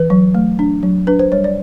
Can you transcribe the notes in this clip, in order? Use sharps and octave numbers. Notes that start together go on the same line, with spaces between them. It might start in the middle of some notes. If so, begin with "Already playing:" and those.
Already playing: E3 B4
F#3
A3
D4
F#3
D4 B4
C5
G3 C#5
D5